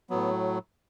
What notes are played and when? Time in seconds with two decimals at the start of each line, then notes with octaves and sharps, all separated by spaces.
0.10 A2 F#3 B3